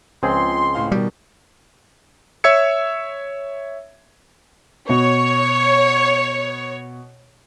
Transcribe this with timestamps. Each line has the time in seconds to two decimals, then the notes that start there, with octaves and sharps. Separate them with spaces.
0.23 C#2 F3 C4 G#4 C6
0.75 A2 F5
0.92 B2 D#3 G3
2.44 C#5 E5 E6 G#6 C#7
4.89 B2 C#5 C#6